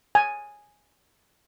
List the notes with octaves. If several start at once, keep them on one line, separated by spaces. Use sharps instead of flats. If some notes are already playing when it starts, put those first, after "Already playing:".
G#5